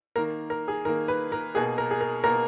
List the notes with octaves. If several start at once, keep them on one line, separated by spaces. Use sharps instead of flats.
D#3 A#3 A#4
A#4
G#4
D#3 A#3 A#4
B4
A#4
B2 A#3 G#4
A#4
G#4
A#4
B2 A#3 A#4